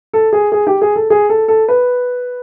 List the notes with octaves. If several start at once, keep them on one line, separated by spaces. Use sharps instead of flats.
A4
G#4
G#4
G4
G#4
A4
G#4
A4
A4
B4